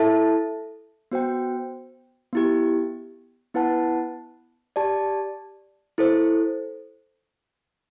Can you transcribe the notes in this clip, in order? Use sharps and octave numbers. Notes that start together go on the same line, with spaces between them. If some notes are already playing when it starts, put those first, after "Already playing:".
Already playing: E4 A4 E5 A5
B3 F#4 C5 G5
B3 E4 G4
B3 E4 B4 F#5 A5
G4 D5 A5
E4 A4 C5